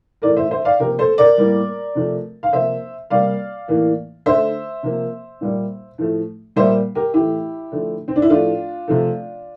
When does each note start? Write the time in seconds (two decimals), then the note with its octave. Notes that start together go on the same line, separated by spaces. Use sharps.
0.22 A2 E3 A3 A#4 D5
0.37 C5 E5
0.51 C5 E5
0.65 D5 F5
0.80 C3 F3 A#3 G4 A#4
0.99 A4 C5
1.18 A#4 D5
1.38 A2 G3 A#3
1.95 C3 F3 A3
2.43 F5
2.53 C3 F3 A#3 C5 E5
3.10 C3 G3 A#3 D5 F5
3.68 A2 E3 A#3
4.26 D3 A3 C5 E5
4.83 C3 F3 A#3
5.41 A#2 G3 A#3
5.98 A2 F3 A3
6.56 A#2 G3 A#3 C5 E5
6.95 G4 A#4
7.14 A2 E3 A3 E4 G4
7.72 D3 F3 A3
8.08 C4
8.16 D4
8.22 E4
8.30 A2 F3 A3 D4 F4
8.88 C3 F3 A3